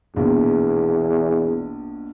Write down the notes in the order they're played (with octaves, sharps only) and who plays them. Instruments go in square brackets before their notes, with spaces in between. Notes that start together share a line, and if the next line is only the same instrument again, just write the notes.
[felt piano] A#1 B2 [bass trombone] E2